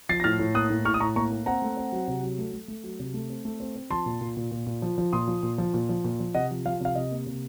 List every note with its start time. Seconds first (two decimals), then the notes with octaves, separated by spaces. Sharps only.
0.09 F3 A6 C7
0.20 A#6
0.24 A2 F6 A6
0.39 A2
0.54 A#3 D#6 F#6
0.70 A2
0.85 A2 C#6 F6
0.94 D#6
1.00 A2 A#5 C#6
1.16 A#3 A#5 C#6
1.31 A#3
1.46 C4 F#5 A#5
1.62 A3
1.77 C4
1.92 F#3
2.08 C3
2.23 F#3
2.39 A3
2.53 A3
2.68 A3
2.84 F#3
2.99 C3
3.14 A3
3.30 C4
3.45 A3
3.60 C4
3.75 C4
3.90 F3 A5 C6
4.06 A#2
4.21 A#2
4.37 A#2
4.51 A#2
4.67 A#2
4.82 F3
4.98 F3
5.13 A#2 C6 D#6
5.27 F3
5.43 A#2
5.58 F3
5.74 A#2
5.89 F3
6.04 A#2
6.20 F3
6.35 C3 D#5 F#5
6.51 F3
6.65 F3 F5
6.80 C3 F5
6.95 C3 D#5
7.11 A#3
7.26 C3